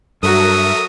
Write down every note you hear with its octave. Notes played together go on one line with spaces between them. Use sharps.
G2 F#3 F#4 A4 A#4 E5 D#6